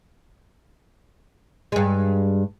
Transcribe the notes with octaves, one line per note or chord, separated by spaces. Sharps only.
G2 G#3